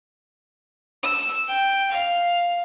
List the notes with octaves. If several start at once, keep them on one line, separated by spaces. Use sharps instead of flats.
E6
G5
F5